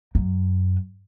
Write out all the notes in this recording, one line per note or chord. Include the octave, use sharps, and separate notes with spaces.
F#2